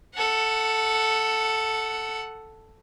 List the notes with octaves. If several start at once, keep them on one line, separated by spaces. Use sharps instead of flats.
A4 F#5